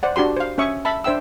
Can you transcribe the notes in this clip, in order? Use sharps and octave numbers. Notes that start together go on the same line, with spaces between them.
C5 D5 F#5
D4 F#4 G4 C6
C5 F5
C#4 C#5 E5 C#6 D#6
E5 A5 B5
D4 C5 E5 G5 E6